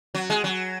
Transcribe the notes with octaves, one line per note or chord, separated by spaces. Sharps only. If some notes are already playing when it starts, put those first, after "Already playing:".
F#3
G#3
F#3